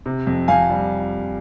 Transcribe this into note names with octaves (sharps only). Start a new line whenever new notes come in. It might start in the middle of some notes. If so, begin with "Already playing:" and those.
C3
F2
F2 F5 G#5
G3